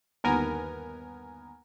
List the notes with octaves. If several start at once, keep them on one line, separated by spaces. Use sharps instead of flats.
G1 D#2 B3 A#4 G#5